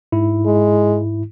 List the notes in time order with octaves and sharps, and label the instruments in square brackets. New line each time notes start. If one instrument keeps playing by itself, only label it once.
[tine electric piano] G#2 E4
[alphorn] G#3